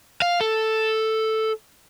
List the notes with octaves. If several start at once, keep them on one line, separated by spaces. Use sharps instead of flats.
F5
A4